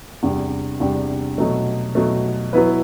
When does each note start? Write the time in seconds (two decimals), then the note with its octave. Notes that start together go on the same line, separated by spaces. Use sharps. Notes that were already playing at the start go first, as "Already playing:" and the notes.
0.23 E2 C3 G3 D4 G4
0.80 E2 C3 G3 D4 G4
1.38 B2 F#3 A3
1.95 B2 F#3 A3
2.53 F#3 B3 E4 B4